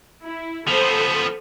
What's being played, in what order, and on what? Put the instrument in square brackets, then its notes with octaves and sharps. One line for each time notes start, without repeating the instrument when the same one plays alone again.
[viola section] E4
[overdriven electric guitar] F3 B3 [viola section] A4 C5